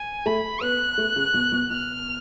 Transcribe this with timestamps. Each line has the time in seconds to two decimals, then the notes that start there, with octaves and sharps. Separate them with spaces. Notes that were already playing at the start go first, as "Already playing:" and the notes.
Already playing: G#5
0.26 A3 B5
0.61 B3 F#6
0.98 A3
1.16 C#3
1.34 B2
1.52 B2
1.70 B2 F6